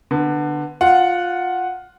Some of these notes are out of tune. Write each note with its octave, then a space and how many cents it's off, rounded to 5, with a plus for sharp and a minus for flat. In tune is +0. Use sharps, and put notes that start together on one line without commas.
D3 +15 B3 +0
F4 +15 F#5 +0